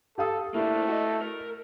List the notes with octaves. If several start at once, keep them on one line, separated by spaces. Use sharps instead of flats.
G4 A4 F5 D#6
A3 A#3 D4 E4
F#4 D#5
A#4